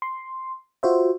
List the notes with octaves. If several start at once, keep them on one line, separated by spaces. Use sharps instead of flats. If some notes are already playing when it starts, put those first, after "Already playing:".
C6
F4 F#4 C5 E5